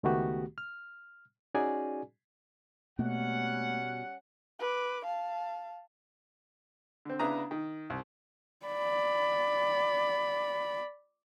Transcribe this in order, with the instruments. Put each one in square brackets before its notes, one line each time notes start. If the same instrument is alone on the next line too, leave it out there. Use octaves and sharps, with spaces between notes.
[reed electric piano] C#2 D#3 A3 B3 F#4 G4
F6
C#4 D#4 F#4 G#4 D5 G#5
[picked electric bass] B2 [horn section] G3 C#4 F#5 [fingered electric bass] A3 A#3
[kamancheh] B4 D6
F5 A5
[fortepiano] D3 C4
C#3 B3 D4 E4 A#5 D#6
D#3
C2
[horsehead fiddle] D5 B5